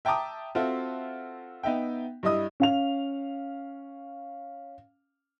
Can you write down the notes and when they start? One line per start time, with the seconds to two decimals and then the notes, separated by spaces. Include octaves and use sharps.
0.05 E5 G5 A5 A#5 D6 D#6
0.55 C4 F4 F#4 A4 E5
1.63 B3 D#4 E5 G5
2.23 G2 G3 E4 D#5 D#6
2.60 C#4 F5 F7